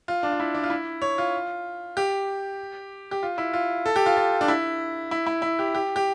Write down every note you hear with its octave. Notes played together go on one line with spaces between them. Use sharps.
F4
D4
F4
E4
D4
F4
E4
C#5
F4
G4
G4
F4
E4
F4
A4
G4
F4
F4
D4
E4
E4
E4
E4
G4
G4
G4